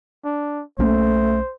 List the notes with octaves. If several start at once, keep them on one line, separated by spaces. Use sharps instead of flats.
D4
B1 A3 A#3 C#4 C5